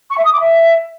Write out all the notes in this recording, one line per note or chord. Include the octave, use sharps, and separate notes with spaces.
C#6
E5
D#6
D6
E5